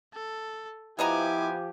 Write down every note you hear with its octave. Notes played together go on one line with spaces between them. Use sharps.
A4
F3 B3 E4 G4 D#5 G#5 A#5 D6